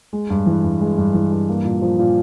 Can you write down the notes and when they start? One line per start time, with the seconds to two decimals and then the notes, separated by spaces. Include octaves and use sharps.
0.13 G#3
0.30 G2
0.46 E3
0.64 G2
0.81 G#3
0.98 G2
1.14 E3
1.31 G2
1.49 A#3
1.65 A#2
1.82 F3
1.99 A#2